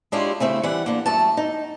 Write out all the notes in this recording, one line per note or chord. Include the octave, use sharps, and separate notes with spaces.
G#3 C#4 D4 E4 F4 G4
C#3 A3 C4 E4
E3 G3 F#5
D3 A#3
F#2 A3 A5
D#4